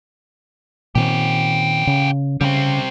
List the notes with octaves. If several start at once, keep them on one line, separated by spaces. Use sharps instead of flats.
A#2 D#3 C4 C#4 G4
C#3
C#3 G3 C4